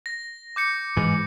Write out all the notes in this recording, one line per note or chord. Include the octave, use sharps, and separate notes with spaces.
A#6
D6 G6 C#7
G#2 E3